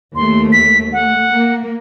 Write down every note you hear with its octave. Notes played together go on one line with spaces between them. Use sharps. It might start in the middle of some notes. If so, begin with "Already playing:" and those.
D#2 A3 C6
B6
A3 F#5
A#3